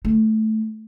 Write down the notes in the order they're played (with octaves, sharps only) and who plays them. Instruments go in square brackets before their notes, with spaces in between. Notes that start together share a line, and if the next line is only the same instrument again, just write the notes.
[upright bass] A3